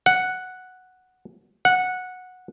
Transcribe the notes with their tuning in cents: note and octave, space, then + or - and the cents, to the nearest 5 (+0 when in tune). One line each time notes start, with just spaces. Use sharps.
F#5 +0
F#5 -10